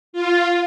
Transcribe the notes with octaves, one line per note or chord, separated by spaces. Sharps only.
F4